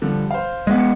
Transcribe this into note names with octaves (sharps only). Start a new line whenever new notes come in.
D3 F3 G3
C5 F5
G#3 B3
C#7